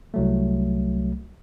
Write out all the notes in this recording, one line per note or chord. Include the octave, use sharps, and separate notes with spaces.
C2 F#3 A3